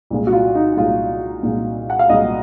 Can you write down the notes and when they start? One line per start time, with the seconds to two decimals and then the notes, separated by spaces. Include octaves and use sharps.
0.10 C2 A#2 G#3
0.27 F#4
0.33 F4
0.55 D#4
0.77 C2 A#2 G#3 F4
1.43 C2 A#2 G#3
1.90 F#5
1.99 F5
2.09 C2 A#2 G#3 D#5